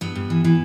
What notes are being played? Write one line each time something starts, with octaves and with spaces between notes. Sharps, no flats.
G2 B3
G2
E3
E3